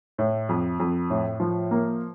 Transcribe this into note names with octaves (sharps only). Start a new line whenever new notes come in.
A2
F2
F2
A2
F3
A#3